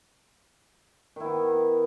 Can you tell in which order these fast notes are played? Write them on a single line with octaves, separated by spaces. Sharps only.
D#3 E4 B3